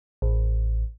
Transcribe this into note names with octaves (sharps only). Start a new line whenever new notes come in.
A1